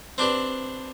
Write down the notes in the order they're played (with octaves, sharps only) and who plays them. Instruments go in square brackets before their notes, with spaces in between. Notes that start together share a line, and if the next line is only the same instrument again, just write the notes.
[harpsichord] C4 D4 G4 B4